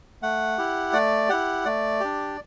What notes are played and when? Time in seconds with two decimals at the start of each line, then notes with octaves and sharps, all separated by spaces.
0.22 A3 F#5
0.58 E4 G4
0.93 A3 D5
1.29 E4 G4 F#5
1.65 A3 D5
2.00 D4 G4